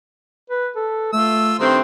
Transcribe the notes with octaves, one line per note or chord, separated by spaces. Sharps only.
B4
A4
A3 F4 E6
G2 D#3 A3 C4 C5